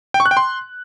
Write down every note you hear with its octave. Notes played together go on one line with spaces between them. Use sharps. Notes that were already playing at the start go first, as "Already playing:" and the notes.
G5
C#6
F#6
G5
C6